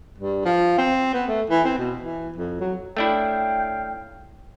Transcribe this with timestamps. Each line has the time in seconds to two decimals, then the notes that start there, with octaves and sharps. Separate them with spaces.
0.19 G2
0.45 F3
0.78 C4
1.13 B3
1.28 A3
1.50 E3
1.64 C4
1.78 B2
2.01 E3
2.37 F2
2.60 F#3
2.97 A3 D4 E4 C#5 F5 G5